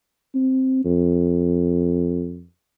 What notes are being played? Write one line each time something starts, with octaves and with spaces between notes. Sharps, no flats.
C4
F2